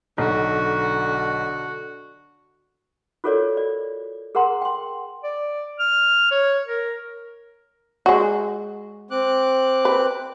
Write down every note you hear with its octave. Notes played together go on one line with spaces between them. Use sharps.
B1 D3 F#4
F4 F#4 A4 A#4 C#5 D5
D5
G#4 A#4 F#5 A#5 C6
G5 C6
D5
F6
C#5
A#4
G#3 F#4
C4 D6 F#6
B4